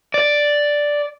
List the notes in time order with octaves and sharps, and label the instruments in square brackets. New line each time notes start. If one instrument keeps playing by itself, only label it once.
[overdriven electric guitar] D5